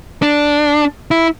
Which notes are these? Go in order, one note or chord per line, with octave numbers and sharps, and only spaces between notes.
D4
E4